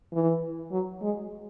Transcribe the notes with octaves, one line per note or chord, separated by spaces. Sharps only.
E3
F#3
G#3